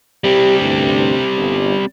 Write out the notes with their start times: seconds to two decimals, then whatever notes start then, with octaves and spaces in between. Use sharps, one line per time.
0.24 G3 C4 G4
0.60 A1 D2 G2
1.37 G1